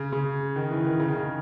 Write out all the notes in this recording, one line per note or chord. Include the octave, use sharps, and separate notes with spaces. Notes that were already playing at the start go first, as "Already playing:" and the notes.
Already playing: C#3
C#3
D#3
E3
D#3
C#3
D#3
C#3